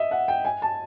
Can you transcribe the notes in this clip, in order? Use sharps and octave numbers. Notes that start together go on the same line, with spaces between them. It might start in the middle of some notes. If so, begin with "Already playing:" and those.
Already playing: D#5 E5
F#5
G5
G#5
A5